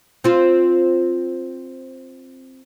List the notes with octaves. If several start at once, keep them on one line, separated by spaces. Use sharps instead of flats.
C4 F4